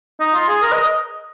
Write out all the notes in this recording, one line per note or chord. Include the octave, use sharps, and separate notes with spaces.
D#4
F4
G#4
A#4
D#5